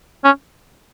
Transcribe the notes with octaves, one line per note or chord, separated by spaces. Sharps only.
C#4